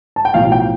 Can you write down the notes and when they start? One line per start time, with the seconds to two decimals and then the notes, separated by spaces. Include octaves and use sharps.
0.16 A5
0.25 G5
0.34 B1 A2 F3 F5
0.52 G5